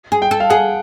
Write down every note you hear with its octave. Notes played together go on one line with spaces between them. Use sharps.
G#4
G5
A4
F5
G#4 F#5